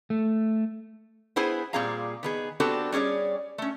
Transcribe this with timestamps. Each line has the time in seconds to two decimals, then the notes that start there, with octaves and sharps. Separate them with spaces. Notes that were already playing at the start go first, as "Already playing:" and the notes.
0.10 A3
1.36 B3 E4 G#4 C5 G#5
1.73 A#2 G3 C4 G#4 F5 A#5
2.23 D#3 B3 G#4
2.60 B3 C4 D4 F#4 G4 A4
2.92 G3 C#4 G#4 C#5 D5
3.58 A3 C#4